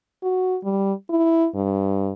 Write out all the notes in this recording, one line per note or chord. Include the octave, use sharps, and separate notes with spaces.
F#4
G3
E4
G2